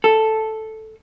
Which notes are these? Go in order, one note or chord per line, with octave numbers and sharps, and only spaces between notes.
A4